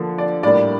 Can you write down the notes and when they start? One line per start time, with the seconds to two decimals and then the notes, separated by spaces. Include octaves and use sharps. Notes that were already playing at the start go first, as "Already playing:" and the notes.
Already playing: D3 F3 A#3
0.18 D5
0.43 A2 G3 A#3 D4 D5